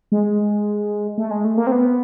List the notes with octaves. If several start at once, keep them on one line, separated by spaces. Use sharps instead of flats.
G#3
A3
G#3
A3
A#3
C4
B3